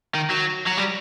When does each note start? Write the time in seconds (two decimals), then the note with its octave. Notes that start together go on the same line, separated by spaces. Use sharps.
0.15 D#3
0.30 F#3
0.66 F#3
0.77 G3